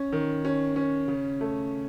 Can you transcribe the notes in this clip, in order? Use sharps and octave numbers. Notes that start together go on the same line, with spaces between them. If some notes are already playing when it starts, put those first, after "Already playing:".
Already playing: C#4
D#3
C#4
C#4
C#3
A3